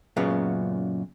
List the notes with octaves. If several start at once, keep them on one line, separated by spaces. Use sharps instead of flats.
F#2 A#2 C#3 B3